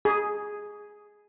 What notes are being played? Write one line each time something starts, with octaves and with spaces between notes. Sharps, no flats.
G#4